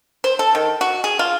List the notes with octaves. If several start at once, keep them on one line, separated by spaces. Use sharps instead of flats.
C5
A4
D#3
F#4
G#4
F4